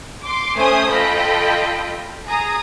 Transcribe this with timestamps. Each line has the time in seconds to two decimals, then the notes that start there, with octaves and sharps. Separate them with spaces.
0.23 C6 D6
0.55 A3 C#4 C5 G#5 D#6
0.89 F4 A4 D#5 G5 B5
2.27 G#4 A#5 D#6